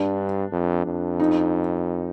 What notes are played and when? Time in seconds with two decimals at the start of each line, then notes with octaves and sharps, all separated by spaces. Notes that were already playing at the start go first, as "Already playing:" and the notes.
Already playing: G2 D4
0.52 F2
0.86 F2
1.20 D#4